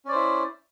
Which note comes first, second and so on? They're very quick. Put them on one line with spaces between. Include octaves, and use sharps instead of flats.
C#4 D5 C5 E4